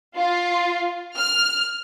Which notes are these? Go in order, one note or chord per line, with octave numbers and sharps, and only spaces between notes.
F4
F6